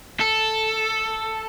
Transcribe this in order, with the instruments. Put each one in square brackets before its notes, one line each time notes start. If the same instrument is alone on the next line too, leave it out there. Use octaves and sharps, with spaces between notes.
[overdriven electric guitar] A4